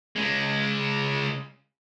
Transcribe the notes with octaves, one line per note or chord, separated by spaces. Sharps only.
C#3 G#3